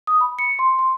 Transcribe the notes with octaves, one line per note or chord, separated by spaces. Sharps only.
D#6
B5
C#7
C6
C6